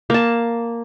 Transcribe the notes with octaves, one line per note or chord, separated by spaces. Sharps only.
A#3 A5